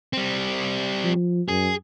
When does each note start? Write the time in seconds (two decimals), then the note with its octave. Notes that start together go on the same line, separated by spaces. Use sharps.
0.13 G3 C4
1.04 F3
1.48 F#2 G#4